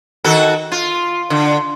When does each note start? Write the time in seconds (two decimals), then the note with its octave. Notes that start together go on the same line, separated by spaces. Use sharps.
0.24 D#3 F#4 A4
0.72 F4
1.30 D3